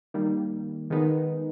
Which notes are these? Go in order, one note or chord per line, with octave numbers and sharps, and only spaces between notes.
D#3 G3 A#3
D#3 G#3 B3 D#4